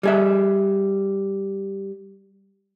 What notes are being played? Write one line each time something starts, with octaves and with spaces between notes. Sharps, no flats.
G3 G#4 E5